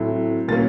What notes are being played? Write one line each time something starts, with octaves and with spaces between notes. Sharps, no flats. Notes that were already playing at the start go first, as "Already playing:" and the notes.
Already playing: A2 F#3 A3 C4
A#2 F#3 A#3 C#4 A6